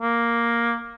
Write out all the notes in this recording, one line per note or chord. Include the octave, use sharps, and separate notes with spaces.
A#3